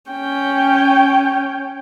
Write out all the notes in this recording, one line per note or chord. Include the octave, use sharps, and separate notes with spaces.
C#4 G5